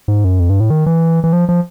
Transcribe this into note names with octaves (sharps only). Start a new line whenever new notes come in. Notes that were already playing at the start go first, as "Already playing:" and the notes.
G#2
F#2
F2
G2
A2
D#3
E3
E3
F3
F3